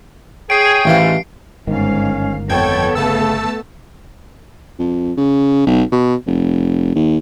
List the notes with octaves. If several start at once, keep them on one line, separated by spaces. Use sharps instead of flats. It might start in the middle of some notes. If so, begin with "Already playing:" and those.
G#4 C#5 G5 C7 D7
A1 G#2 E3 F5
G1 G#2 D#3 C#4 F5
F2 B3 A4 C#5 G5 G#6
C#3 A3 A5 E6
F2
C#3
B1
B2
F1
D#2